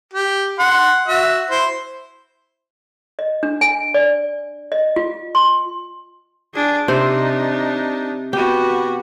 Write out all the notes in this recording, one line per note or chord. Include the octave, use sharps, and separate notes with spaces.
G4
F#5 C6
F#4 E5
E4 C5
D#5
D4
G#5
D5
D#5
F4
C6
D4 G#4
C3 D4 D#4 C5
B3 F#4 G4